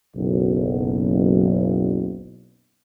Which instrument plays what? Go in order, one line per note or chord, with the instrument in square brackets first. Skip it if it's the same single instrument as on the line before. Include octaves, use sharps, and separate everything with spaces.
[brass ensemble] F#1 B1